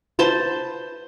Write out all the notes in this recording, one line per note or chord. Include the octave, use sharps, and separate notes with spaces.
B4 C5 A5 C6